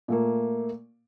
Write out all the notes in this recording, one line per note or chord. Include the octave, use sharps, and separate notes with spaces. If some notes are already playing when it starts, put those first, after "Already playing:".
A#2 A3 A#3